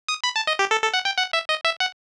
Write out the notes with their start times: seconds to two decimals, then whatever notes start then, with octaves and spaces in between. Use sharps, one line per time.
0.08 D#6
0.24 B5
0.36 A5
0.47 D#5
0.59 G4
0.71 A4
0.82 A4
0.94 F#5
1.05 G5
1.18 F#5
1.33 E5
1.49 D#5
1.65 E5
1.80 F#5